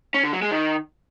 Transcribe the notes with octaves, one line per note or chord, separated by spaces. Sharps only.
C#4
D3
F#3
G#3
D#3